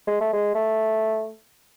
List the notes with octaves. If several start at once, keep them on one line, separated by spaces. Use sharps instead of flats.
G#3
A3
G#3
A3